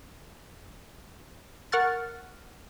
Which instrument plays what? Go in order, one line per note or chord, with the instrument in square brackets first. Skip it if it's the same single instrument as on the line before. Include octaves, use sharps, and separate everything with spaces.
[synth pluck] A#4 F#5 C#6 F6 F#6 A6